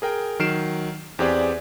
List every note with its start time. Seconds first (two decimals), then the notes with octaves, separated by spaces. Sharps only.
0.02 G#4 A#4 G5
0.39 D#3 F#3 F6 C7 D7 E7
1.19 E2 C4 G4 G#4 D5